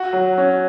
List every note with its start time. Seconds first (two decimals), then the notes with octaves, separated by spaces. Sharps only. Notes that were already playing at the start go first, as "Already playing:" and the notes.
Already playing: F#4
0.13 F#3
0.38 C#4